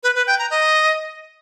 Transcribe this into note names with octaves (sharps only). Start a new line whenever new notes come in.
B4
B4
G5
A#5
D#5